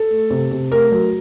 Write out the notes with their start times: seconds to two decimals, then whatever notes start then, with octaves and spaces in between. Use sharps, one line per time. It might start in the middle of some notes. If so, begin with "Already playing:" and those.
Already playing: A4
0.10 A3
0.30 C3
0.51 C3
0.72 A3 A#4
0.92 F#3